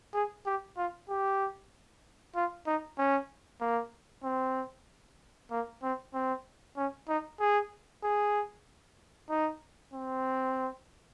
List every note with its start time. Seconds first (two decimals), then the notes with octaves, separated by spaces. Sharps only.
0.14 G#4
0.46 G4
0.77 F4
1.09 G4
2.35 F4
2.66 D#4
2.98 C#4
3.61 A#3
4.24 C4
5.51 A#3
5.83 C4
6.14 C4
6.77 C#4
7.08 D#4
7.40 G#4
8.03 G#4
9.30 D#4
9.93 C4